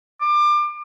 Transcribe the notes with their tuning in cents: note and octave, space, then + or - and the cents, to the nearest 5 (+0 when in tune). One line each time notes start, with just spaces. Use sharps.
D6 +30